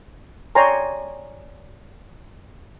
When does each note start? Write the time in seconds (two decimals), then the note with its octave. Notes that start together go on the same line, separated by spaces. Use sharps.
0.55 C#5 D5 G5 G#5 A#5 C6